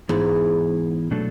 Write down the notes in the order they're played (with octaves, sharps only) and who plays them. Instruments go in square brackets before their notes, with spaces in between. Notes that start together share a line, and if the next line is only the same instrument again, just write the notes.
[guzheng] G#2 [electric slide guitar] E3 B3 E4 G#4
[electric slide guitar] B2 F#3 A3 D4 A4